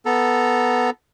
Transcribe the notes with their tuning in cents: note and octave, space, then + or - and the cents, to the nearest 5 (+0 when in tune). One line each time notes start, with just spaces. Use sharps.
B3 +0 A4 +0 A#5 +0